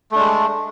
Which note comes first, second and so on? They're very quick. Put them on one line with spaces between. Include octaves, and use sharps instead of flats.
A3 D4 G#3